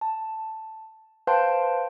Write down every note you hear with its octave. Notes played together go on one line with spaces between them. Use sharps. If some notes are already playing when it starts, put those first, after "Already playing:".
A5
B4 C5 F5 G5 A5 C6